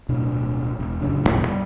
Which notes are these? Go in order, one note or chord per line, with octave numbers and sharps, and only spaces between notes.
D1 B2 D4
E1
D1 F#2 C#3 D4
B1 E2 G2 B2
G3